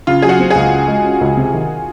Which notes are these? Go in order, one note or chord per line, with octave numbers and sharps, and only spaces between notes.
C#3 F4
F#3 G#4
F#4
C4
G#4
C#2
C#3
G#3
C#4
C#2
C3
D#3